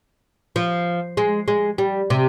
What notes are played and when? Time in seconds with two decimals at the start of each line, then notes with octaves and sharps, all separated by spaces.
0.56 F3
1.17 G#3
1.48 G#3
1.78 G3
2.10 C3